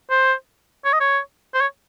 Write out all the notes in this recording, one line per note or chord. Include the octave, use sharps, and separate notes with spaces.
C5
C#5
D#5
C#5
C5
C#5